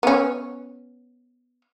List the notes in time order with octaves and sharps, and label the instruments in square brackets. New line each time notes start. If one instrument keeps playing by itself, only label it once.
[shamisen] B3 C#4